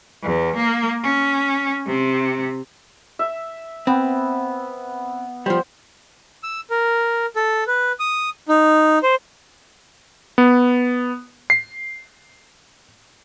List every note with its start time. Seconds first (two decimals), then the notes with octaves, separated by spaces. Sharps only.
0.23 E2
0.56 A#3
1.04 C#4
1.86 C3
3.19 E5
3.87 B3 C4
5.46 F3 G3 C5
6.43 E6
6.70 A#4
7.36 A4
7.67 B4
8.00 D#6
8.48 D#4
9.03 C5
10.38 B3
11.50 C7